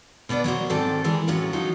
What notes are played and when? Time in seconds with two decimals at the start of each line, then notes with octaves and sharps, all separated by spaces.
0.29 B2 B3 D4 B4 D5
0.44 F#3 A#3 F#4 C5
0.70 G#2 D#3 C4 A4 D5
1.04 E3 G3 G#3 G#4 A#4
1.28 A2 F#3 C#4 F4
1.53 F3 F#3 D#4 F4